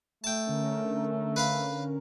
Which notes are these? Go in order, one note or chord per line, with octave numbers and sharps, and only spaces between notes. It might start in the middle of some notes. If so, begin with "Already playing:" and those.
A3 G5 A5
D3 C#4 A#4
B4 F5 B5